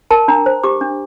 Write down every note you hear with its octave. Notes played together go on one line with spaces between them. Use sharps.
A#4 A5
D4 A#5
C5
G4 D6
D4